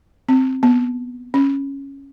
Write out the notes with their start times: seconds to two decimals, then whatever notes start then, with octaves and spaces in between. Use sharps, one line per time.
0.29 C4
0.63 B3
1.34 C#4